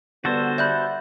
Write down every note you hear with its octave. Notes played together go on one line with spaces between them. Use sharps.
D3 G3 B3 F#4 A4 C5
D5 E5 F#5 B5 F#6 G6